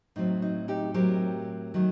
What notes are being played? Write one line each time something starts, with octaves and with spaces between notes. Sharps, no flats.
A2 F#3 C4 D#4
D#4
D#4 G4
A2 F#3 C4 G4 A#4
D#3 F#3 A3